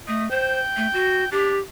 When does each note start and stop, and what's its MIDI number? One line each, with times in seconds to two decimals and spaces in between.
0.08 0.28 57
0.08 0.25 75
0.31 0.59 72
0.31 1.28 79
0.76 0.87 57
0.93 1.24 66
1.31 1.55 62
1.31 1.59 67